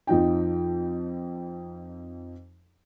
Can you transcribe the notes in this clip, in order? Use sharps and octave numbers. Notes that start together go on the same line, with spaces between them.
F2 F3 D#4 G5